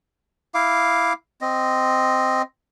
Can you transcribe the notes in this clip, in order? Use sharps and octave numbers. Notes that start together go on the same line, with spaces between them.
E4 F5 D6
C4 D#5